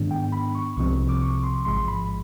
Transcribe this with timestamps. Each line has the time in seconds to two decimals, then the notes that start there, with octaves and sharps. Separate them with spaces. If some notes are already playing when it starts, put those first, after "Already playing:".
Already playing: G#2 D#3 G#3 B3 D4
0.11 G5
0.32 B5
0.55 C#6
0.76 C2 C3 F3 G#3 C4 C#6
1.09 D6
1.22 C#6
1.43 C6
1.65 A1 G#2 F3 G#3 C6
1.88 B5